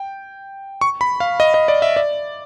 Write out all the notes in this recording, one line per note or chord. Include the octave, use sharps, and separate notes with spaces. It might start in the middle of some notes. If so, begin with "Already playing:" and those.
Already playing: G5
C#6
B5
F5
D#5
D#5
D5
E5
D5